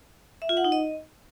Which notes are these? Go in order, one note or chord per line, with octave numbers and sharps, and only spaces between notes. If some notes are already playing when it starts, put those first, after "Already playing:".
E5
F4
F#5
D#4
D#5